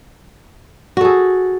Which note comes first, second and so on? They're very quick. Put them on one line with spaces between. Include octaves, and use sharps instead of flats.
F#4 A4 G#4